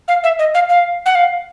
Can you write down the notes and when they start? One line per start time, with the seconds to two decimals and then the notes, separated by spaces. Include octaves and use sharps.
0.08 F5
0.24 E5
0.39 D#5
0.54 F5
0.69 F5
1.06 F#5
1.15 F5